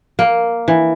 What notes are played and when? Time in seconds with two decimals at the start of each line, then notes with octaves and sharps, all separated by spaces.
0.19 A#3
0.68 E3